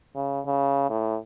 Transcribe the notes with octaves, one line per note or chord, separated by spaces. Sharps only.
C#3
C#3
A2